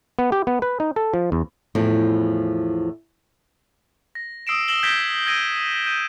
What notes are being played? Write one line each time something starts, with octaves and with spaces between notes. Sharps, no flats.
B3
G4
B3
B4
D#4
A4
F3
E2
E2 A2 F3
A#6
D#6 E6 C7 D7 E7
E6 A#6 E7 F#7 G7
G6 G#6 A#6 B6 D7 G7
D#6 E6 G#6 A#6 D7 D#7
G6 D#7